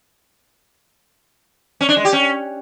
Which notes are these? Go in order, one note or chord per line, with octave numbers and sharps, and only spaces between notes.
C#4
D4
G#3
G4
C#4